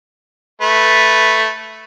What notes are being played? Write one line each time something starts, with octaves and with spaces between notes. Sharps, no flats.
A3 B4